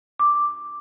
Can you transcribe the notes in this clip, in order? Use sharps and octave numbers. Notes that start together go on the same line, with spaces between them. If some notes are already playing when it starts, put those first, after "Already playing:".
D6